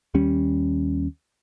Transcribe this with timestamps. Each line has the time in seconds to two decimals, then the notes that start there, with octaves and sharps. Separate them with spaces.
0.14 D#2 G3 C#4